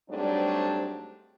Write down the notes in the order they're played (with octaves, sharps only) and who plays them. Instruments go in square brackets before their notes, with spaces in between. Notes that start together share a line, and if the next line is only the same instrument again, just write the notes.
[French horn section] G#2 F#3 G3 A3 C4 D4